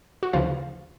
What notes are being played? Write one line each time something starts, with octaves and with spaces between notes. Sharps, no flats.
F#4
D2 C#3 E3 F3 F4